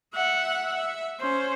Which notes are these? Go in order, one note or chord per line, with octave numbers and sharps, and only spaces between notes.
E5 F#5
E5
C#4 C5